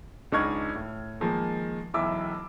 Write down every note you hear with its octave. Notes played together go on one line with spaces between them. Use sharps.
C#2 D4 D#4 C#6 F6 G#6
A2
D#3 F3 G#3 A#3
E1 B1 E4 E5 D6 E6